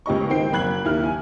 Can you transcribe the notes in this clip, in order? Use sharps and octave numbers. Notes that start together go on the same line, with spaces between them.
C#2 G4 D#5 C#6
D#3 C4 G5 C7
F#1 B5 F#6 G#6 F#7
D#2 E4 F6
G#5